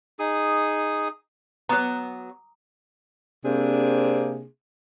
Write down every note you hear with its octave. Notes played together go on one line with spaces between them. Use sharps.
D#4 G#4 D#6
F#3 B3 A#5 D6 D#6
C3 A#3 C4 D4 G#4